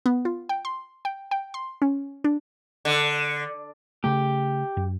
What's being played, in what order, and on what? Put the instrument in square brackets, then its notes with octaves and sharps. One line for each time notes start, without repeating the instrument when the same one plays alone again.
[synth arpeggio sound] B3
F4
G5
C6
G5
G5
C6
C#4
D4
[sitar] D3
[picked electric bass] C#3 A3 [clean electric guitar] G4
[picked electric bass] F#2